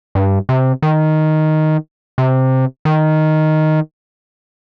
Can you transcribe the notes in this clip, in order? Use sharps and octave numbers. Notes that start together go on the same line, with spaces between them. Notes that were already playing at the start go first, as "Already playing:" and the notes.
G2
C3
D#3
C3
D#3